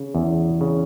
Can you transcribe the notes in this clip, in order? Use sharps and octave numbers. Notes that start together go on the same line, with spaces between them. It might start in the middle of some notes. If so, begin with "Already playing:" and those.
Already playing: C#3
E2
C#3